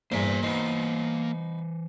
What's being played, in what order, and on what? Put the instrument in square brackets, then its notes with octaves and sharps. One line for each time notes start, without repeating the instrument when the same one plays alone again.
[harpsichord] E2 G2 [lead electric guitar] A#3 G#5 [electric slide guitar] C5 A#5
[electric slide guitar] E3 C5 [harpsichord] B3 D#4